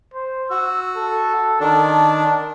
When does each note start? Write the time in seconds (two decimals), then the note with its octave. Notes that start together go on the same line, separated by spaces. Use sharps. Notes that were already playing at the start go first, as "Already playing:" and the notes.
0.14 C5
0.50 F#4 E6
0.96 A4
1.61 D#3 D4 A5